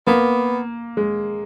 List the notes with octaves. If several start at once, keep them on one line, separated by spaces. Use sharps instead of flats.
A#3 B3
G#3